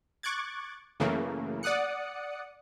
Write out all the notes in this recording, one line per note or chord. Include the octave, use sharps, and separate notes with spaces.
C#6 D6 F#6 G#6 A6
F#2 C#3 E3 A3 A#3
D5 F#5 D#6 F#6 C#7